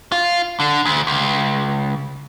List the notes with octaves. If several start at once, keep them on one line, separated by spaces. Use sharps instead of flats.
F4
D3
D2
C#2